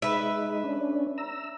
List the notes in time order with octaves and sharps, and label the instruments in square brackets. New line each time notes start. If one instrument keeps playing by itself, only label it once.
[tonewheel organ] G#3 D#4 [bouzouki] B4 E5
[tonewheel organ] C#4 D4
A#5 E6